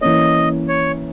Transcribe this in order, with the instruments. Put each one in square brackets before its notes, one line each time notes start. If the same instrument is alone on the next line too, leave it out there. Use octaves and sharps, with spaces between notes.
[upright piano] E3 A#3 C#4 [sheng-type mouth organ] D#5
[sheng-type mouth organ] C#5